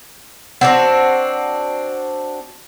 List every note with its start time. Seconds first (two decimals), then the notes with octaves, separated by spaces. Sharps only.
0.61 C4 D4 F#4 F#5